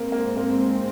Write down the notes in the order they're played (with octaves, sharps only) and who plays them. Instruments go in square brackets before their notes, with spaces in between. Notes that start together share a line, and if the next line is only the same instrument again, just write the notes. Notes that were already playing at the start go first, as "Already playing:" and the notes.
Already playing: [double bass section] G#2 G#3 C4 [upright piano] A#3
[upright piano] A#3
A#3